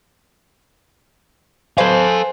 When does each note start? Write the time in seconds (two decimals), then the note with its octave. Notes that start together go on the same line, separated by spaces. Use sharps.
1.78 A4 B4 C5 F5 G#5